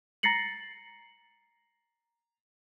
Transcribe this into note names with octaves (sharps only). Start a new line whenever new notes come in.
A#5 A6 A#6 C7 C#7 F#7